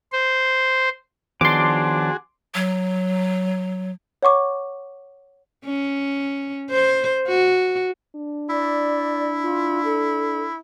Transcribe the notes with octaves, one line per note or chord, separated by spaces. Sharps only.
C5
D#3 F3 B3 D4 F#4 G#4 C6 D6
F#3
C#5 F#5 C#6 D6
C#4
C5
F#4
D4
E4 D5
F4
A4